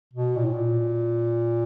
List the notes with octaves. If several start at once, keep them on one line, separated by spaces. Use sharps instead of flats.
B2
A#2
A2
A#2